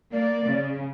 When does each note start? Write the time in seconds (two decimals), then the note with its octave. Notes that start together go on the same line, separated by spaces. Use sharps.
0.13 A#3 D5
0.46 C#3